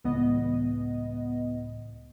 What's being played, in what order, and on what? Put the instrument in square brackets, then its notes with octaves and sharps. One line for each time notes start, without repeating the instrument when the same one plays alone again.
[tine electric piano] C#2 A2 [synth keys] E3 B3 D#5